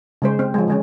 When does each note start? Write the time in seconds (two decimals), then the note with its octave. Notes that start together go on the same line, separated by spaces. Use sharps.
0.22 C#3 G#3 C5
0.39 C4
0.54 F3 G#3
0.68 D3 G#3 C#4